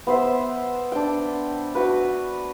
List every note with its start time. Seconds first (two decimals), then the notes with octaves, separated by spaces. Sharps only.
0.07 B3 C5 E5
0.92 D4 G5
1.75 F#4 B4